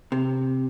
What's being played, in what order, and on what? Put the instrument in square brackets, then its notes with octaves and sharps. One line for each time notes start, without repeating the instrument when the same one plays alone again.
[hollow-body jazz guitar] C3